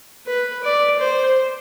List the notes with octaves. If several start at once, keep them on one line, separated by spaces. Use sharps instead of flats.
B4
D5
C5